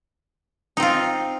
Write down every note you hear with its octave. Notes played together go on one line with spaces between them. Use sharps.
C4 D#4 F4